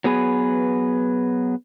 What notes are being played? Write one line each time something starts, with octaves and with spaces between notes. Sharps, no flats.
F#3 B3 G#4 B4